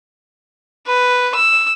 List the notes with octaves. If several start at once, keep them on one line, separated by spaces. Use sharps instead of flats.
B4
E6